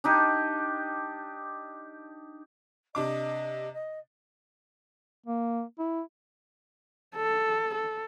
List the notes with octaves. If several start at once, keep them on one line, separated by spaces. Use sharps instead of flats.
D4 D#4 G4
C3 D4 D#5 D6
D#5
A#3
E4
A4
A4